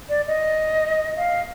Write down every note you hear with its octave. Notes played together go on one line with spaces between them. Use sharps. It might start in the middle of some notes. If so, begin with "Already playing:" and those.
D5
D#5
F5